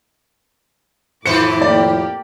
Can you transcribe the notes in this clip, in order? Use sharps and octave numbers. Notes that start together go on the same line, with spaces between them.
F2 A2 D#3 B4 C5 D6 C#7
A#3 G4 D5